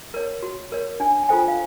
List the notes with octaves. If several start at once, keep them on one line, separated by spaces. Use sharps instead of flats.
A#4 C#5
F#4
A#4 C#5
D4 G#5
G#5
F4 A4 C5 G5
F5